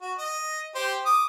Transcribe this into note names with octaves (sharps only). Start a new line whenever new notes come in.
F#4
D#5
G4 C5
D6 D#6